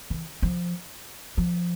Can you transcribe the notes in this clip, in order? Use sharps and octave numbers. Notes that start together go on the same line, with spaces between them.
E3
F3
F3